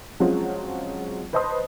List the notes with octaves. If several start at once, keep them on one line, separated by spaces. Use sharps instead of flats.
F3 F#3 G#3 C4 C#4 F4
B4 C5 D#5 A5 C6 D#6